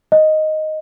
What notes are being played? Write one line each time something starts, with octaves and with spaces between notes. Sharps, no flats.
D#5